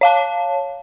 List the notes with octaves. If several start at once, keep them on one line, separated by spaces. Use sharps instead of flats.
C#5 F5 A5